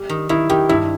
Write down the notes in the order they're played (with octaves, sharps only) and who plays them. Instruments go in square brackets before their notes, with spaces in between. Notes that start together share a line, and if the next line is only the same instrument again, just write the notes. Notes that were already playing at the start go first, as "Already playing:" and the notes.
Already playing: [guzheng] G3
D#3
[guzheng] D#3 [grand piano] E4
[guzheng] D#3 [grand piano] G4
[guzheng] G2 [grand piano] E4